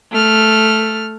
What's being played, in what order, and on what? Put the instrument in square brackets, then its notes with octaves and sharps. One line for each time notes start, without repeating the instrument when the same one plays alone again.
[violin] A3 F6